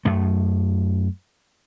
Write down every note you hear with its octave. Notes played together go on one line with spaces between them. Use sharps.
F#2 A3